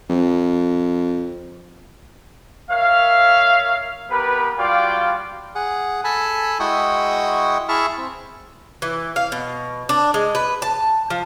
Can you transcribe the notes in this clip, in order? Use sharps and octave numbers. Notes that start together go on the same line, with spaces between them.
F2
A#4 C#5 E5 F5
B3 G4 A#4 B4
G3 F4 F#4 D5 F5 G5
G#4 F#5
A4 G#5 A5 B5
G#3 E4 F#4 G5 C#6 D#6
E4 G#4 E5 A5 C#6 F6
C4
E3
F5
B2
D4
G#3
B4
A5
F3